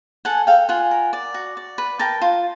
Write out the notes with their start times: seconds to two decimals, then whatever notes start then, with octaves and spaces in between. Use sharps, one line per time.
0.25 A4 F#5 G#5
0.47 A4 F5 G5
0.69 F4 F#5 G#5
0.91 A#4
1.13 D5
1.34 F#4
1.57 D5
1.78 B4
1.99 A#4 G5 A5
2.22 F4